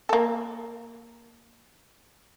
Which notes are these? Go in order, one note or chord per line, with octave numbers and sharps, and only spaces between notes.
A#3 A4